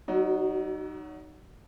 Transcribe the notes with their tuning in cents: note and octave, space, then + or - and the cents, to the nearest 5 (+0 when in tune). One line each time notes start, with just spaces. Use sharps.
F#3 +35 D#4 -15 F#4 +0